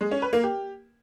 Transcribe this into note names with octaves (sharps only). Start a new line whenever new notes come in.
G#3
C#4
B4
A#3
G4